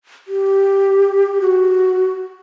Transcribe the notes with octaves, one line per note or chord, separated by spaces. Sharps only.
G4
F#4